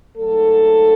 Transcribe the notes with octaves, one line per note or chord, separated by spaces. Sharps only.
G#2 F#3 A3 A4